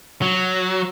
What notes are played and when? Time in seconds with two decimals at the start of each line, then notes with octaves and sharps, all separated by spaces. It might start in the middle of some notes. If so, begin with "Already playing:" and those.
0.22 F#3